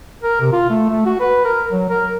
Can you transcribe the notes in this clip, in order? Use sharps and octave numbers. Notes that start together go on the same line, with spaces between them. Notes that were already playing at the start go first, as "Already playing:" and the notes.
A#4
C3
F4
A3
A3
F#4
B4
A#4
F#3
A#4